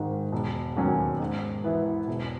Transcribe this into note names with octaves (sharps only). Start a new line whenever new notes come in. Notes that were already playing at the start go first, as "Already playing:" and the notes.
Already playing: G#1 G#2 D#3
E1
D#2 D#3 F#3 C#4
G#2
E3 B3 E4
E1